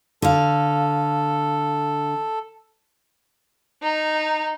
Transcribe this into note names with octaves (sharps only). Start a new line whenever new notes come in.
D3 A4 F5
D#4